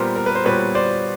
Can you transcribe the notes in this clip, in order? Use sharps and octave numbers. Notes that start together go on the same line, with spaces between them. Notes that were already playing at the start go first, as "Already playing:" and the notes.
Already playing: A#2 G3 B3 A#4 C5
A#4
B4
C5
A#2 G3 B3 B4 C#5
C5 D5